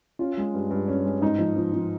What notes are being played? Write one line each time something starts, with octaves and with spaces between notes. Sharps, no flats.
C#4 F4
G#3
G2
G2
C#4
G#3
G#2 D#4
F3
F3
F3